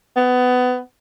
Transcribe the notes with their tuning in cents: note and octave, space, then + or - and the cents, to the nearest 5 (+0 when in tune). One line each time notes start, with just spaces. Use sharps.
B3 +20